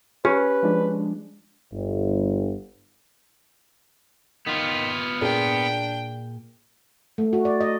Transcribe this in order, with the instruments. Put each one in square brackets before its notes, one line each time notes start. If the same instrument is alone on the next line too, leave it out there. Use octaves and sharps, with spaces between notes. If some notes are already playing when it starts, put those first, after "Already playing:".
[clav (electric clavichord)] C#4 [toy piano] G4 [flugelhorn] B4
[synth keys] F3 G#3 D4
[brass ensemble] G1
[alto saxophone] D#3 [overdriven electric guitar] B3 F4
[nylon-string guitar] A#2 G#4 A#4 [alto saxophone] D4 [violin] G5
[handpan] A3
F#4
D5
D#5